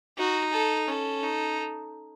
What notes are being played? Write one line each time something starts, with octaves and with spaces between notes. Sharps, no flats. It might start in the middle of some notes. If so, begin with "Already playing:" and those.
D#4 F#4
A4
C#4 A4
D#4